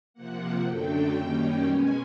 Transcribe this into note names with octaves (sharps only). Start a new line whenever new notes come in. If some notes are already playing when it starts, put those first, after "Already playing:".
C3 F3 A#3 F#5
F#2 D3 F#3 A3 D4 G5
F#2 D#3 G3 A#3 C#4
B2 G#3 C#4 G#5